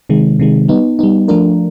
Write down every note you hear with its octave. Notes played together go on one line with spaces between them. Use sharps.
C3 D#3 G#3
C3 D#3 G#3
G3 B3 D#4
G3 B3 D#4
F3 A3 D4 F4 A#4